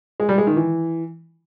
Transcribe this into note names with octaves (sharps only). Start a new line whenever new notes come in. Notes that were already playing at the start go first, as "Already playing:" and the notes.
G#3
G3
G#3
D#3
E3